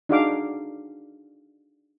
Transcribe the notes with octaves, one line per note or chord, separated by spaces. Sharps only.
D4 D#4 F#4 G#4 F5 D6